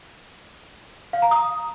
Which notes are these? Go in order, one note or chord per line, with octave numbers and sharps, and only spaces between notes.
F5
A#5
D#6